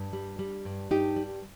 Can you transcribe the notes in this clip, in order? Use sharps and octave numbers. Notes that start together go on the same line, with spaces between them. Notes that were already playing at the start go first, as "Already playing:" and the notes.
Already playing: G2
G3
G3
G2
G2 D#4 G4
G3